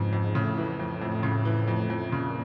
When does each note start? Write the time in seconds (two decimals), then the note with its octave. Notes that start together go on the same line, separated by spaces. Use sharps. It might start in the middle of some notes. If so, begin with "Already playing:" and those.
Already playing: F2 G#2 C#3 E3
0.13 F2
0.35 A2 C#3
0.58 E3
0.79 F2
1.02 F2
1.23 C#3
1.45 E3
1.68 F2
1.90 F2
2.11 A#2 C#3